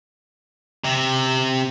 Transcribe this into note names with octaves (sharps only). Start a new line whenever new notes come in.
C3